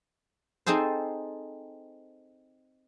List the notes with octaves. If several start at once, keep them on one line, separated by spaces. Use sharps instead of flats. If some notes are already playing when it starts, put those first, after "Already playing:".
C4 D#4 G#4 A4 C5